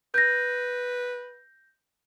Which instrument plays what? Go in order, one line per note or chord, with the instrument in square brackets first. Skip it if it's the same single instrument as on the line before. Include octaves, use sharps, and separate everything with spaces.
[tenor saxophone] B4 [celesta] G6 A#6